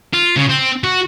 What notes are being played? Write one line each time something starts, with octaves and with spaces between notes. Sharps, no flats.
F4
C#3
C4
F#4